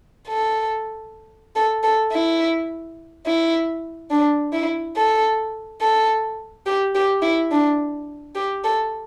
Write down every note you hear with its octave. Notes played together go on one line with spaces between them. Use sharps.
A4
A4
A4
E4
E4
D4
E4
A4
A4
G4
G4
E4
D4
G4
A4